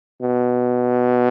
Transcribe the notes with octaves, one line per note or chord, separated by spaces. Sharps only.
B2